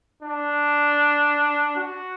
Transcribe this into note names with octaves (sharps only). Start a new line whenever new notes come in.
D4
F#4